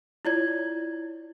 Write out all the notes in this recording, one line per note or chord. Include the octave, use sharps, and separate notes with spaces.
E4 F4 C#5 D5 G#6